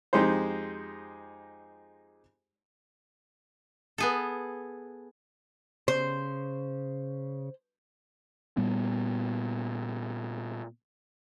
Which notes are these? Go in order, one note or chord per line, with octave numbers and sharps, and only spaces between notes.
F2 G#3 D#4 G4 C5
B3 G#4 A4
C#3 C5
A#2 G3 B3